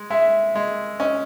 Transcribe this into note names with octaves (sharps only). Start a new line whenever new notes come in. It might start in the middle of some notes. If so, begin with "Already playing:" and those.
Already playing: G#3
G#3 E5
G#3 D#5
C#4 D#5